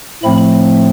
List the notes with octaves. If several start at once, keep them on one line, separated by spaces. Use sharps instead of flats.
A2 F3 A3 C4 B5